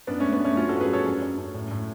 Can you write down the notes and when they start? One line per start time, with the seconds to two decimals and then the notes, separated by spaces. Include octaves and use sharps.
0.07 F#2 B3 D4
0.20 G#3 A3 C#4
0.33 B3
0.40 F#2 A3 C#4
0.56 F#3 C#4 F4
0.69 G#2 F#4 A4
0.81 G#4 B4
0.90 F#3 A4 C#5
1.06 F#2
1.22 F#2
1.38 F#2
1.54 A2
1.71 A2